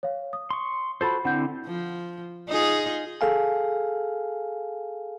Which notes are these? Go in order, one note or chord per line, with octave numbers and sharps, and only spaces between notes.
C#5 F5
D#6
C6 C#6
F4 F#4 A4 C5 B5
D3 C4 E4 F#5 G6
F3
D#4 F4 G#4
G#4 A4 F5 G#5